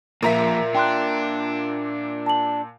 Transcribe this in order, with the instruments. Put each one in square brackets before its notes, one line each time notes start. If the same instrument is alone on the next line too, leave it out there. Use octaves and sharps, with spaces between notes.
[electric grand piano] A#2 A#5 B6 [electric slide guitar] F3 A#3 [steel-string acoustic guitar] A#4 E5
[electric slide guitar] D4 [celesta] G5 C6 F#6
[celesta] A5 F#7